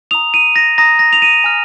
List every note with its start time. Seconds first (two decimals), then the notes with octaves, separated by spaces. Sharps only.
0.11 A#5 D#6 F7
0.34 D#7
0.56 A#6
0.78 A#5 D#6 A#6
0.99 A#6
1.13 F7
1.22 D#7
1.44 G#5 F6